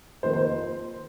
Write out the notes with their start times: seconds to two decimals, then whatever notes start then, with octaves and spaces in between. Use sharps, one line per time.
0.23 F2 D#3 A#3 C5
0.33 C5